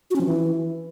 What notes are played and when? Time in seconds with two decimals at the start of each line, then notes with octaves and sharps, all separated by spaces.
0.10 F#4
0.16 C#4
0.21 F3
0.26 E3